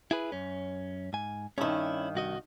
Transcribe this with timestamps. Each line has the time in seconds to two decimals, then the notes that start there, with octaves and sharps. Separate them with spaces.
0.11 E4 G#4 B4
0.32 F#2 C#4
1.13 G#2 G#5
1.58 G2 D#3 C#4 E4
2.15 C2 F#4 D#5